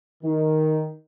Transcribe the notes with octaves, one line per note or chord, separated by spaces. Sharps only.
D#3